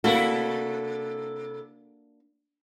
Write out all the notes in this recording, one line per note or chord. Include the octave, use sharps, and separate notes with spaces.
C3 A#3 D4 E4 F#4 A4